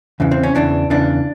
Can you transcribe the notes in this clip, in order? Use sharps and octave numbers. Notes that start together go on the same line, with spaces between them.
E2 C#3 E3
C4
C#4
E2 C#3 E3 D4
E2 C#3 E3 D4